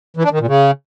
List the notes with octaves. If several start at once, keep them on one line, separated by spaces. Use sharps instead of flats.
E3
D4
D#3
A#2
C#3